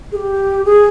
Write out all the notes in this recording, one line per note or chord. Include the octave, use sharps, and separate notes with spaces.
G#4
G4
G#4